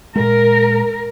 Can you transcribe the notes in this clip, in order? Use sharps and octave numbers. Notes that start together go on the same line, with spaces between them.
A#2 G#3 A#4